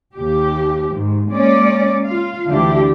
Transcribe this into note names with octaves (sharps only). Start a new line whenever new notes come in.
D#2 G4
G#2 D#3
G#3 A#3 C#4 D5
F4 F5
D2 D3 E3 D4 E4 G4